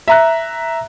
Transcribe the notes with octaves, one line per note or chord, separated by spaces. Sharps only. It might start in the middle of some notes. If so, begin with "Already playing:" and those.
E5 A#5 F#6